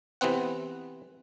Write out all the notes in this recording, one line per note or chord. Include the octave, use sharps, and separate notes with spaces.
C3 E3 B3 C4 F#5